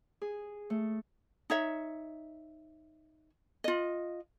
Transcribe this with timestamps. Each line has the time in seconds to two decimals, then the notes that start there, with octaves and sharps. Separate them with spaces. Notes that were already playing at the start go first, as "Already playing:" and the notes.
0.22 G#4
0.70 A3
1.50 D#4 C#5 E5
3.64 F4 D#5